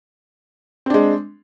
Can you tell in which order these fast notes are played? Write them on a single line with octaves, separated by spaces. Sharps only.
C4 D4 G#3